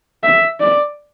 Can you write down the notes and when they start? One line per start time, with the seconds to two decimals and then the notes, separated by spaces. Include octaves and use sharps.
0.23 E5
0.60 D5